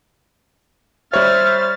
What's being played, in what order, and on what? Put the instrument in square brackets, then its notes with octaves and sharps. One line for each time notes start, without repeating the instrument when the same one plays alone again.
[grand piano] G3 C#5 [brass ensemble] C5 [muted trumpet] E5 [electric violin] F6 A6